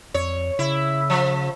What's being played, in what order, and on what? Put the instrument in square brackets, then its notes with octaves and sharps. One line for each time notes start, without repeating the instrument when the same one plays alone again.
[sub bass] F2 [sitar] C#5
[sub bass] C#3 [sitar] E4
[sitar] F3